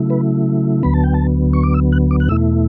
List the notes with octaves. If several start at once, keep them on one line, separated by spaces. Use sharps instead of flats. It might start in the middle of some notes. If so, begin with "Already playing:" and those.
Already playing: C#3 F#3 A3 E4
B4
D2 D3 F#3 B3 B5
A5
G5
A5
C#6
D6
E6
F#6
D6
F#6
E2 B2 A3 E4 E6